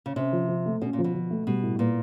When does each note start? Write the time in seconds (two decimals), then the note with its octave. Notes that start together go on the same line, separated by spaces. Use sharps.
0.06 C#3
0.16 C3 C#4
0.33 F3
0.49 F3
0.66 A3
0.82 B2 C#4
0.93 A#2
0.98 F3
1.04 B2
1.14 F3
1.31 A3
1.47 B2 G3
1.63 A2
1.79 A#2 B3